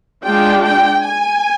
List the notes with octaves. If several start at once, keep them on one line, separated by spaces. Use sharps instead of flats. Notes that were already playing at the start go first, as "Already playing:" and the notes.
G#3 D4 F4 G5
G5
G#5